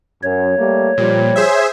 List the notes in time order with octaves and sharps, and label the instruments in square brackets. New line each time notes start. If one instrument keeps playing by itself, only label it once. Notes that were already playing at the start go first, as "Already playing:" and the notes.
[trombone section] F#2 [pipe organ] C#5
[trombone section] G3 A3 A#3
[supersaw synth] A#2 [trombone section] F3 G3
[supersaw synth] G#4 C5 E5